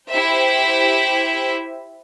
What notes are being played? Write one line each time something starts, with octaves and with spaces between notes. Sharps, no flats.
E4 G4 C5 E5